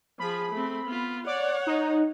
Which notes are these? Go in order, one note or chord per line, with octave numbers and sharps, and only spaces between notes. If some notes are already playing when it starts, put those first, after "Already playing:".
F3 G#4 B5
A3 C4
B3 F4
C#5 D5 F#5
D#4